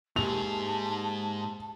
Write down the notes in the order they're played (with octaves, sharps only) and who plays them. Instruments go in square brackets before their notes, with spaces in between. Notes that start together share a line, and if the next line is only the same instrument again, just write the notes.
[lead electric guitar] G#2 G#4 [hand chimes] A#3 G4 [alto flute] A5 [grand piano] F7